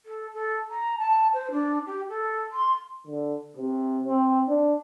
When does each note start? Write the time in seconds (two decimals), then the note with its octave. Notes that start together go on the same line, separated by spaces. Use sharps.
0.05 A4
0.33 A4
0.70 A#5
0.98 A5
1.33 C5
1.51 D4
1.86 G4
2.09 A4
2.52 C6
3.07 D3
3.57 C3
4.06 C4
4.49 D4